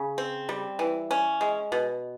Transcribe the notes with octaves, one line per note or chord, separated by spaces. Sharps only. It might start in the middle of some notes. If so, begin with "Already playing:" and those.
Already playing: C#3
C4
G3
E3
C#4
G#3
B2